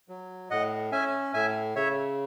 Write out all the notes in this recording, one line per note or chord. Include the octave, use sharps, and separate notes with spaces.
F#3
A2 D#5 F#5
C#4 E5 G#5
A2 E5 G#5
C#3 C#5 E5